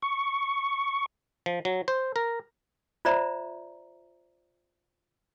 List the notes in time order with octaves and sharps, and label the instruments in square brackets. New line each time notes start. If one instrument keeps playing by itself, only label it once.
[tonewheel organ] C#6
[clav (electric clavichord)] F3
F#3
C5
A#4
[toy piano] F4 C5 D5 E5 A#5